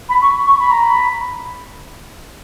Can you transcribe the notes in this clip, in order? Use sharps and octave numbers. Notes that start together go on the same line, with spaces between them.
B5
C#6
C#6
B5
A#5
B5